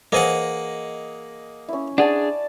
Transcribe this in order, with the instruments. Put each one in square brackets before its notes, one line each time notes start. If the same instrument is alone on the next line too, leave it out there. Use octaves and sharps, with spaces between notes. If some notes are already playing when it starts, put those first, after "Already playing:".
[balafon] E3 B4 C5 [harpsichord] A#3 G#4 F#5 [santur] D#5
[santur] C#4 E4
[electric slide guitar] D4 G#4 [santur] D5 A5 [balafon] F#5